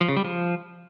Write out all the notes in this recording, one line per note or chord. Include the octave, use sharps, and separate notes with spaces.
F3
C#3
G3
F3